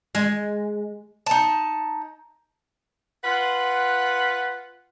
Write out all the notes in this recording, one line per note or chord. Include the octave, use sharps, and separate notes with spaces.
G#3
D#4 A5
F4 B4 F#5